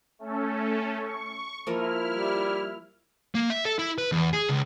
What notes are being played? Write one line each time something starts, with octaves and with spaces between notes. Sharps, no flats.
A3 C#4 A4
C#6
F3 A#3 E4 A#4 F6
G3
A#3
E5
A4
E4
B4
E2
G#4
C#2